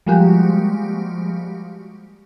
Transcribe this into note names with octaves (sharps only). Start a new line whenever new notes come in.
F3 G3 G#3 A#3 F#4 G4